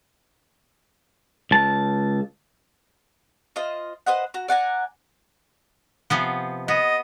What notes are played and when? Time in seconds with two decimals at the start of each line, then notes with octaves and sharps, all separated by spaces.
1.51 C#2 A5
3.56 F4 C5 D#5
4.06 B4 C5 D#5 F#5
4.34 F#4 A#5
4.48 D5 F#5 G#5 A#5
6.10 C3 F3 B3
6.68 B3 D#5